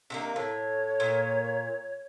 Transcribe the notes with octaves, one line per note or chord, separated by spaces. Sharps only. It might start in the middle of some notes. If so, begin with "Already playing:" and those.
C3 D#3 A#3 D4
A2 C#5
A#2